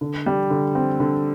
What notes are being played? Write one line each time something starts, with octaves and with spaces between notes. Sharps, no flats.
D3
G3
D3
C4
D3